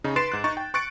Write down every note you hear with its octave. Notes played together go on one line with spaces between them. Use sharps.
C#3 D#4
B4 C6 A6 C7 D7 E7
G#2 F#6
D#4 C#6 A6
G5
C#6 F#6 A6 C#7 D7